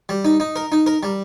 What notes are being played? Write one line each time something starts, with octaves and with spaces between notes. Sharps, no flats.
G3
D#4
D#4
A#4
D#4
A#4
G3